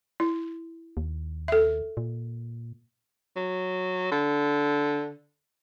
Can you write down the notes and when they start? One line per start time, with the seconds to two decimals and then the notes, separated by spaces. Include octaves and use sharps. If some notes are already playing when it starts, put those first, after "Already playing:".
0.20 E4
0.97 D#2
1.48 A4 E5
1.97 A#2
3.36 F#3
4.11 D3